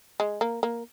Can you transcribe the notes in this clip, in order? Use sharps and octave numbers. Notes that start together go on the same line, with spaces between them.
G#3
A#3
A#3